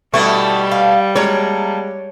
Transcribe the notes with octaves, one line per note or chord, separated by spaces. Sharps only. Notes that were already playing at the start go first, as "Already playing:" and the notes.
B2 D3 G3 A3 E4 C#6
F5
F#3 G#3 A#3 D4 C#5